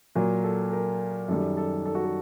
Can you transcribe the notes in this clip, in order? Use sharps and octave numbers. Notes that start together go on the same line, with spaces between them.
A#2 F#3 A#4
A4
A#4
F#2 D#3 G3 A4
A4
A4
F#4
A4